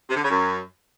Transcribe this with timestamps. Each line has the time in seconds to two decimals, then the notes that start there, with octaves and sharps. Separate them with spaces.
0.09 C3
0.16 D3
0.23 C#3
0.30 F#2